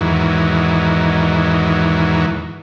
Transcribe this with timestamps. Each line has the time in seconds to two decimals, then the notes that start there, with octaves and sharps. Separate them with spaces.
0.01 E2 G#2 D#3 E3 F#3